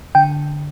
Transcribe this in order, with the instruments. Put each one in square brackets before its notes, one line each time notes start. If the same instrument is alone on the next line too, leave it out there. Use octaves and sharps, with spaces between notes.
[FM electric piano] D3 G5